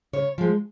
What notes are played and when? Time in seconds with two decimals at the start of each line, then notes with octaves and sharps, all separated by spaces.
0.13 C#3 C#5
0.38 F3 G#3